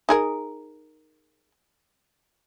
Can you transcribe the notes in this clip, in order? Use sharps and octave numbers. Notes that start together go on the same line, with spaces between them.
D#4 G#4 A#4